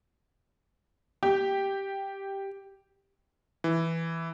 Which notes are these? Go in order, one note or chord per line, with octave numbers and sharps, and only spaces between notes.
G4
E3